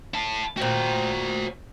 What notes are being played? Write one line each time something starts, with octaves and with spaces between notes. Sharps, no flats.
E4 A5
A#2 F#4 C5 G5